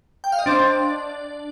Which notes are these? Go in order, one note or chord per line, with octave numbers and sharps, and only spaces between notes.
G5
F5
D#5
D4 C5 D5